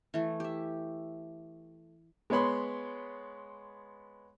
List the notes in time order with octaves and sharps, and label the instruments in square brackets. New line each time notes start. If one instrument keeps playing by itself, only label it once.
[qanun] E3 A3
G4 E5
[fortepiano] G#3 B3 C#5 B5 C6